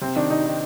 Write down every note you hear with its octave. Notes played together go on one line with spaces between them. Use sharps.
C3 C4
D#3 D4
C3 D#4
D#3